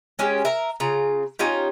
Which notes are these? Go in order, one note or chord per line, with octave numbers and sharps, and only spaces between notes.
G#3 C#4 G4
A#4 E5
C#3 F4 A#5
C#4 D#4 F4 G4